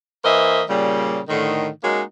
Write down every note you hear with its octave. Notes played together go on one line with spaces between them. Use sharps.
E3 A#3 C5 D#5 E5
A#2 C#3 G3
A2 D3 D#3
G#3 A#3 C#4 D#4 F#4